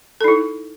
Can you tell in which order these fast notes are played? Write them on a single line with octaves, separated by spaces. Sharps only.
A4 D#4 E4